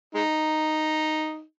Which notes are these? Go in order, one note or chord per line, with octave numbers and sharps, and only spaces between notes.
G#3 D#4